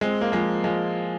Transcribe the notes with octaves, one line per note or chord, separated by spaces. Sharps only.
G#3 C4
A#3
F3 G#3
F3 G#3